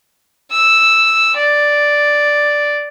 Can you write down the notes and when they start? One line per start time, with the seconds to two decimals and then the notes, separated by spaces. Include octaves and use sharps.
0.52 E6
1.37 D5